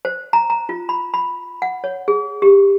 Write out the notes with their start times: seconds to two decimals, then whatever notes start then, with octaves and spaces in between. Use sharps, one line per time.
0.05 C5
0.33 A#5
0.50 A#5
0.69 F4
0.89 B5
1.14 B5
1.62 F#5
1.84 C#5
2.08 G#4
2.42 G4